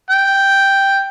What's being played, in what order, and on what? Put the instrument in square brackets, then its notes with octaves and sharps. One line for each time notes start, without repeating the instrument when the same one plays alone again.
[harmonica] G5